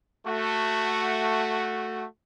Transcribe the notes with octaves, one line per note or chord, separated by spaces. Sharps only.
A3 F#4